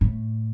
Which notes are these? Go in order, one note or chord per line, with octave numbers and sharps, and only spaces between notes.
A2